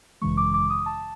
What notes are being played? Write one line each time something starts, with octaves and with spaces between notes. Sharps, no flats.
G#1 F#2 C#3 E3 G#3 C#6
D6
D6
D#6
A5